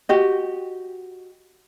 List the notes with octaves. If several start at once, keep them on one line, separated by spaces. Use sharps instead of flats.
F#4 G4 D#5